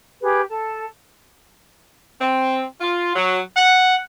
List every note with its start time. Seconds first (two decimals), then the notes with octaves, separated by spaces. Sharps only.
0.20 G4 G#4 B4
0.48 A4 A5
2.21 C4
2.81 F4
3.16 F#3
3.57 F#5